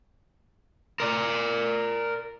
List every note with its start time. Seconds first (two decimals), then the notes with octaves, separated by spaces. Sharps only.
1.00 A#4 D5